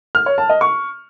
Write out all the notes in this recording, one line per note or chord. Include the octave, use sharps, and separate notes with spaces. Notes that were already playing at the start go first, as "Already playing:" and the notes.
F6
C#5
A5
D#5
C#6